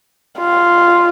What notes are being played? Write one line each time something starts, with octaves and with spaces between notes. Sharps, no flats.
F4